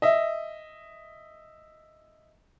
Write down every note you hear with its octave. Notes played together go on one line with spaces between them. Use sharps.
D#5 E5